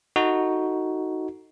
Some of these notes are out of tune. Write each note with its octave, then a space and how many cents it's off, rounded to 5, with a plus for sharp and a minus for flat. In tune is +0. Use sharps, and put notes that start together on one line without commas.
D#4 +10 F#4 +0 A4 +20